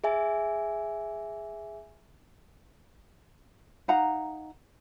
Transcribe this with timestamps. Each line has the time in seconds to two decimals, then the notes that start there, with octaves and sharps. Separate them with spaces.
0.04 G#4 E5 G#5
3.88 D#4 F5 F#5 A#5